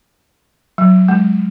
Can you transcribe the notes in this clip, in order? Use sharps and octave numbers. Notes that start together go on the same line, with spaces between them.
F#3
G#3